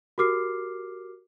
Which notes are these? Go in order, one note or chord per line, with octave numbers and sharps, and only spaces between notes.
F#4 G4 A#4 D6 F6 C7